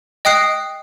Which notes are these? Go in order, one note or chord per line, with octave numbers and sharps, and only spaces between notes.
D#5 G5 D#6 F#6 C7